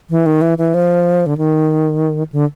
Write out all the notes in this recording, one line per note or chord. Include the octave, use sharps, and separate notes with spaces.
E3
D#3
E3
E3
F3
D3
D#3
D3